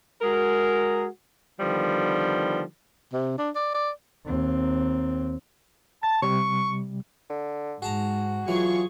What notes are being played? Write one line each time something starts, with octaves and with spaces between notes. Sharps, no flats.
G#3 F#4 G#4 A#4
D3 D#3 F3 G3 B3
C3
D4
D5
D5
D#2 C4
A5 A6
C3 G3 C#6
D3
G#2 F#4 G#4 A5 A#5
E3 F#3 F4 G#4 C#6